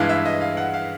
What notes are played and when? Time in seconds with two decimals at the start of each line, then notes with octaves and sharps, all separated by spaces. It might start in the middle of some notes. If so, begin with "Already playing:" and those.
Already playing: G2 E3 G#3 F5
0.09 E5
0.25 D#5
0.41 F5
0.57 F#5
0.74 F5